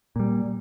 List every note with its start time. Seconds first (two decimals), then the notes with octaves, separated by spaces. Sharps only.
0.16 A#2 G3